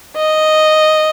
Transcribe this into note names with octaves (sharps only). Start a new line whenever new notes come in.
D#5